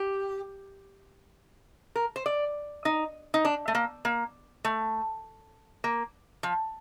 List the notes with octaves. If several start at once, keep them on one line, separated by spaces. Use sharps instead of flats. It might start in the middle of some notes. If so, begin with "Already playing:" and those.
Already playing: G4
A#4
C5
D5
D#4
D#4
D4
A3
A#3
A#3
A3
A#3
F3